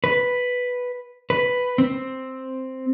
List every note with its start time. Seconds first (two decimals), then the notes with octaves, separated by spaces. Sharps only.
0.04 B4
1.30 B4
1.78 C4